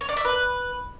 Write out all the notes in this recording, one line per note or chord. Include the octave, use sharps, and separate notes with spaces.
C#5
D5
E5
B4